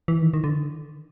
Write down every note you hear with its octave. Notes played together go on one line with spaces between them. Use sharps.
E3
D#3
D#3
D3